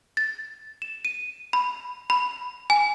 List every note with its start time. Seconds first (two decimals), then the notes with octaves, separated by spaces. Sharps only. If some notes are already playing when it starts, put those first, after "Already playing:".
0.17 A6
0.82 E7
1.05 D#7
1.53 B5
2.10 B5
2.70 G#5